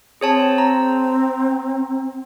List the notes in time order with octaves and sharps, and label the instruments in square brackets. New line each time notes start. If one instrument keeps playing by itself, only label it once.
[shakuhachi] C4 [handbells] G#4 C#5 A5
[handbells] A#5